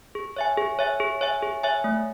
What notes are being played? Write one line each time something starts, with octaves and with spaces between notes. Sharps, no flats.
G#4
C#5 E5 G#5
G#4
C#5 E5 G#5
G#4
C#5 E5 G#5
G#4
C#5 E5 G#5
A3